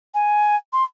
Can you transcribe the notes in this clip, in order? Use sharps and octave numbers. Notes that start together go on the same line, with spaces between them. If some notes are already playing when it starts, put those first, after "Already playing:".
G#5
C6